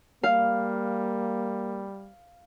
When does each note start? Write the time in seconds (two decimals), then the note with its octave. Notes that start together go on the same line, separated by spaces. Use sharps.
0.23 G3 A#3 F5